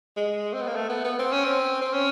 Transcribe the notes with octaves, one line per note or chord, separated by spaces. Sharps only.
G#3
C4
B3
A#3
A3
B3
B3
C4
C#4
C4
C4
C#4